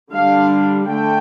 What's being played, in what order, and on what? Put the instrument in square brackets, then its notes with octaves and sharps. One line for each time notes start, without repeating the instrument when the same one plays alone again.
[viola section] D3 G3 D4 F5
D3 A3 G5